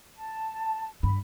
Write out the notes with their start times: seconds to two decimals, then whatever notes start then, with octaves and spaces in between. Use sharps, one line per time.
0.17 A5
1.03 G2 B5